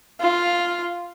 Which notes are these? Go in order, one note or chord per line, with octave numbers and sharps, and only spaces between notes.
F4